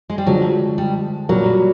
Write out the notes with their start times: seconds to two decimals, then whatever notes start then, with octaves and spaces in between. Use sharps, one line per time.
0.10 G#3
0.18 G3
0.27 D3 F3 F#3 G#3
0.78 G3
1.29 A#2 F#3 G3 A#3